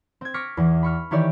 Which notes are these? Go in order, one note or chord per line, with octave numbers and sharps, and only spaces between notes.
C4 G#6
C#6 D6 F6 A#6 B6
E2 E3
B5 C#6 F6
D#3 E3 E4 G4 C#5 D5